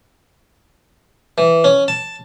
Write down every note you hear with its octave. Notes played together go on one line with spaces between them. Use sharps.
E3
C#4
A5